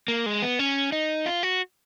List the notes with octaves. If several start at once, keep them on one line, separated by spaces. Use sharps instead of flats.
A#3
G#3
B3
C#4
D#4
F4
F#4